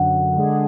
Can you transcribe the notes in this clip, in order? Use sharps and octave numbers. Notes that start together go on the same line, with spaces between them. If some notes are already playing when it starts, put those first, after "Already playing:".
Already playing: F#2 D3 F#3 F#5
D3 G#3 D4 G#4